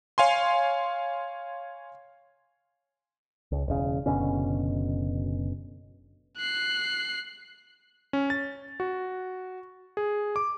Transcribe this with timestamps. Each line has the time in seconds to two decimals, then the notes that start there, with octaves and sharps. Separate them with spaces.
0.18 C#5 F5 G#5 C6
3.52 C#2
3.68 E1 C#3
4.06 F#1 B2 D3 C#4
6.37 F#6 C7
8.13 C#4
8.30 A6
8.80 F#4
9.97 G#4
10.36 D6